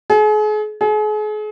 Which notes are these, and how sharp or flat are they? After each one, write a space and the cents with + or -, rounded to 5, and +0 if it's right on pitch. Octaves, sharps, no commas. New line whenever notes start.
G#4 +40
G#4 +40